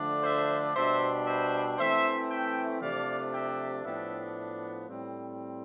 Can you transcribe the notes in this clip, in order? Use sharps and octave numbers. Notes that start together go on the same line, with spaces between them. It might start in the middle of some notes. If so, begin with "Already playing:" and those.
Already playing: D3 F3 A3 D4
C5 E5
B2 G3 D4 C5 E5
C5 E5
E3 A3 C4 C5 E5
E5 G5
C3 F3 A3 D4 D5 F5
E5 G5
A2 F3 B3 D4 E5 G5
A2 G3 C4